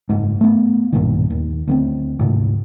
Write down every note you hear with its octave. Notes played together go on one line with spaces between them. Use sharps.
F#1 G#2
A3 B3
B1 G2 A#2 D#3
D#2
D2 A#3 C4
D2 G#2 C3